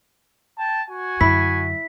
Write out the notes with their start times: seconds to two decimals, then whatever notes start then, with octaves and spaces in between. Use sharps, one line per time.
0.59 G5 A5
0.90 F#4 G#5
1.21 F#2 D3 E4 B6